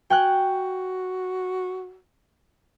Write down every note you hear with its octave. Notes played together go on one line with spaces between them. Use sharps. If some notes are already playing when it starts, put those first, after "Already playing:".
F#4 G5 G#5 F#6